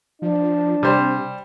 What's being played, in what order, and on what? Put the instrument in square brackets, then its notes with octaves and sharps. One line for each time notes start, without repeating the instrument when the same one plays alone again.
[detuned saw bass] F3 [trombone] D4
[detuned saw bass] C3 [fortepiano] G3 C5